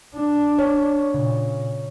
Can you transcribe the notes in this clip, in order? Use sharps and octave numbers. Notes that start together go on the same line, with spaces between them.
D4
C#5
A#2 C#3